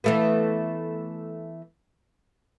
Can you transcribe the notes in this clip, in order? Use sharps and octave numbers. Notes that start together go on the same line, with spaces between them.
E3 A3 B3